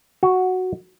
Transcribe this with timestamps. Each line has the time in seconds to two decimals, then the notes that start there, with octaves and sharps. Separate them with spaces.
0.23 F#4